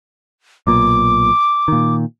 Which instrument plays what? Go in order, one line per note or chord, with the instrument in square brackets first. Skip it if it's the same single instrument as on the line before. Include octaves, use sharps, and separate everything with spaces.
[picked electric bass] B1 A#2 [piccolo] D6
[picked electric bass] A#2 D#3